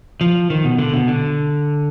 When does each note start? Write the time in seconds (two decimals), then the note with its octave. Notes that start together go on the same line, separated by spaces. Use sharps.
0.21 F3
0.50 D#3
0.64 B2
0.78 D3
0.93 B2
1.08 D3